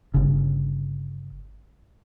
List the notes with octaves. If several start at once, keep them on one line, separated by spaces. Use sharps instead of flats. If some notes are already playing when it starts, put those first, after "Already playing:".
G1 C#3